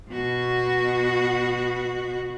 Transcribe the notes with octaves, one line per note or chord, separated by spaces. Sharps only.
B2 F#4